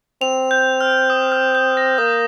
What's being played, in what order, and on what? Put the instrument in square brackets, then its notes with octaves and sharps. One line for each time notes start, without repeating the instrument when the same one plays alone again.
[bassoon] C4 [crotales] F7
[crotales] G6
F6
D#6
F6
G6
A#6
[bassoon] A#3 [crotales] D#6